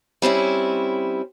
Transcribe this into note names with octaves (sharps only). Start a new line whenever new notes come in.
G3 C4 C#4 E4